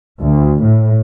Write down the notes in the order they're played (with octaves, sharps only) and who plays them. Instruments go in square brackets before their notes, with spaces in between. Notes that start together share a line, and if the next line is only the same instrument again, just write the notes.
[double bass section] D2
A2